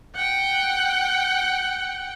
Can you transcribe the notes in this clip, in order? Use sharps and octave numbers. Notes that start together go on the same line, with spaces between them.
F#5 G5